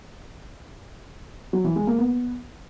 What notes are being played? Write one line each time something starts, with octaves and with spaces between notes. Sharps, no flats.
F#3
E3
G#3
A#3
B3